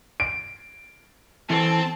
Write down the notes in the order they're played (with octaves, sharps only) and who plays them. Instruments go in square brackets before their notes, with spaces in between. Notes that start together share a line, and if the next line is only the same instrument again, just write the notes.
[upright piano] D7
[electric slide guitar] E3 A4 C5 [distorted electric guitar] C4 [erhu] A5